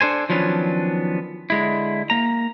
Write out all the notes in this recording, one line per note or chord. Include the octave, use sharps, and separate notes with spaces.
D4 A4 C5 G#5
D#3 F3 F#3 B3 C#4 D4
D3 G#3 E4
A#3 A#5